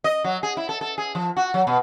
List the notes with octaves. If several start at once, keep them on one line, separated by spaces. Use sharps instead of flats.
D#5
F#3
G#4
E4
A4
A4
G#4
F3
F#4
F#3
B2